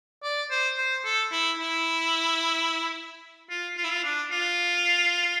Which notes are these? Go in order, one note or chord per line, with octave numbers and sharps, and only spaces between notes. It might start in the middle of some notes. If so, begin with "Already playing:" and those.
D5
C5
C5
A4
E4
E4
F4
F4
E4
F4
D4
F4